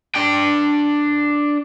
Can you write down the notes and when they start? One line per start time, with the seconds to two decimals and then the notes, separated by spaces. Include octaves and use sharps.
0.15 D4 G5